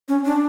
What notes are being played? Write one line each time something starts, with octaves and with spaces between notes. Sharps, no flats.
C#4
D4